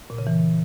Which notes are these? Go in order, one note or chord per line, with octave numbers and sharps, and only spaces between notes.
A#2
C#3
E3